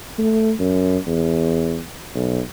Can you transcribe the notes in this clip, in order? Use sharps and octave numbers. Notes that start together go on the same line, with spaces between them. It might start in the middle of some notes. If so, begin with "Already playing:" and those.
A3
F#2
E2
B1